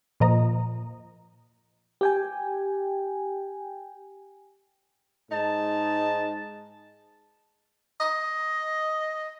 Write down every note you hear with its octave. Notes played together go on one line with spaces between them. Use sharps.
A#2 F3 D#5 A#5
G4 G5 G#5
G#2 D#4 A5
D#5